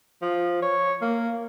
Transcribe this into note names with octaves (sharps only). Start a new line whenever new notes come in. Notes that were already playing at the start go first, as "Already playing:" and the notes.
F3
C#5
A#3